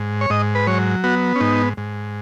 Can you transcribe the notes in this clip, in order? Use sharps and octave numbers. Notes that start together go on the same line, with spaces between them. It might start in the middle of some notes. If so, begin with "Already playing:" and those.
Already playing: G#2
C#5
G#2 D#5
B4
F#3 C#5
B3 F#4
C#4
G#2 D#4
G#2